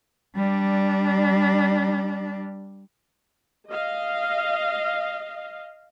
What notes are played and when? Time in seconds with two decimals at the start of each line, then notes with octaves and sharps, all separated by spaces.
0.36 G3 D4
3.69 D#5 F5